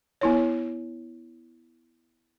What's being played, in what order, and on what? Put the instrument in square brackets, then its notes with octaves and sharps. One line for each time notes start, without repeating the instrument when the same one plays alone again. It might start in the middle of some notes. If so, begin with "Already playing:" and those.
[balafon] B3 E4 C#5